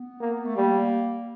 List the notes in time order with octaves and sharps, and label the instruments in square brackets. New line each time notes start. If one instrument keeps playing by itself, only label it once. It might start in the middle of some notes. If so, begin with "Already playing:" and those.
Already playing: [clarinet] B3
[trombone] A#3
[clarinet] A3
[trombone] G3 [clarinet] A#3